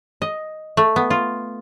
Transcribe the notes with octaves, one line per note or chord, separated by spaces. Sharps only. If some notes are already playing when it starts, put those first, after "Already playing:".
D#5
A3
B3
F4